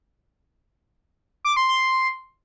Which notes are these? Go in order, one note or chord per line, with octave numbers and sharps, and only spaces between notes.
D6
C6
C6